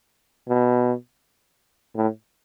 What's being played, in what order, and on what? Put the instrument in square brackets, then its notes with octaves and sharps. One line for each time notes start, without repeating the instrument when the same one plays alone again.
[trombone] B2
A2